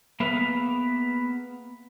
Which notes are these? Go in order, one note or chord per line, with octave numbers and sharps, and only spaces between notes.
A#3 B3 G#4 B4 E5 F5